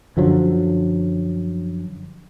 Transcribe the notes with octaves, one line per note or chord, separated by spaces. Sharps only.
F#2 D3 F3 F#3